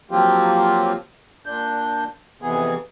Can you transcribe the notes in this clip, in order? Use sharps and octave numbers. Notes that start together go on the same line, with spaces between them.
F3 F#3 A#3 C4 F4 G4
A#2 D4 G6
F2 C3 E3 B3 G#4